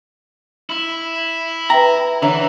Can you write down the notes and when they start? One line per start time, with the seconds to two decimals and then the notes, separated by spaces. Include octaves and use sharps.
0.70 E4
1.70 B4 E5 G5 A#5
2.23 D3 E3 C#5 E5 A#5